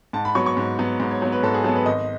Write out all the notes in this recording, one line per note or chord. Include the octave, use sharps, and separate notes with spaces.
G#2 A5
B5
F#3 B3 C#6
C#6
G#2
F#3 B3
G#2
C#5
F#3 B3
B4
G#2 A4
G#4
F#3 B3 A4
B4
G#1 D#5